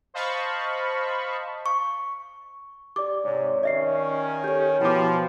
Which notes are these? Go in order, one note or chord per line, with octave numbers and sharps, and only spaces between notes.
C5 D#5 F5 A5 B5 C#6
C#6
G4 D5 D6
G#2 C3 C#5
D#3 C#4 D#5 E5 C7
G4 A4 C#5 G6
B2 F3 E4 G5 A5 B5 D6